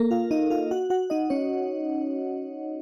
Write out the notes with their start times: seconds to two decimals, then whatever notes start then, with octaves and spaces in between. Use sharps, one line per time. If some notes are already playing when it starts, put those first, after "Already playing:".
Already playing: A#3 A4 A#4
0.11 F4 F5
0.31 D#4 D#5
0.50 F4 F5
0.71 F#4 F#5
0.90 F#4 F#5
1.10 D#4 D#5
1.30 C#4 C#5